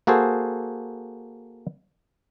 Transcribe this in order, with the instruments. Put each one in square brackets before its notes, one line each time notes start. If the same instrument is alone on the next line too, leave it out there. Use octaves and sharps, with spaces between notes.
[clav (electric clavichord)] A#3 F#4 G#4 A4 C5